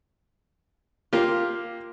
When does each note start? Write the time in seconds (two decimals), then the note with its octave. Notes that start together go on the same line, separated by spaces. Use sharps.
1.13 A#3 F4 G4